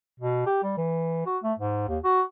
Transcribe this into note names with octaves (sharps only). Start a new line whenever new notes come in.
B2
G4
G3
E3
F#4
A3
G#2
D#2
F#4